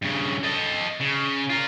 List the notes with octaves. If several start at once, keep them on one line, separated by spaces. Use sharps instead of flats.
G2 C#3
A4 D#5
C#3
F4 A#4